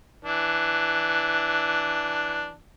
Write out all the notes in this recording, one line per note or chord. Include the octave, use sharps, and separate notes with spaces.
E3 D4